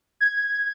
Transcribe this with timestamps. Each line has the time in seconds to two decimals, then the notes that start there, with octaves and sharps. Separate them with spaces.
0.21 G#6